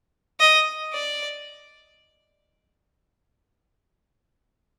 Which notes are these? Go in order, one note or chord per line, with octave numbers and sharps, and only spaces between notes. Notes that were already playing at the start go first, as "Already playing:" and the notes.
D#5
D5